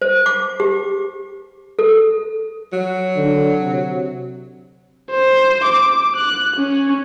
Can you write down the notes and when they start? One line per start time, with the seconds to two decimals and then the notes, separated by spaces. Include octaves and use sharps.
0.02 C5
0.26 D6
0.60 G4
1.79 A4
2.73 F#3
3.16 D3
3.60 C3
5.11 C5
5.64 D6
6.16 F#6
6.56 C#4